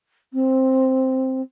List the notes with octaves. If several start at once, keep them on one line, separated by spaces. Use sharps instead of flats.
C4